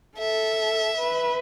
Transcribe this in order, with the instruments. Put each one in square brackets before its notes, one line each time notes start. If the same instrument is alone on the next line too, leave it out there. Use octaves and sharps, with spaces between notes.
[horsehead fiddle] A4 [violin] E5
[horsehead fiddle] B4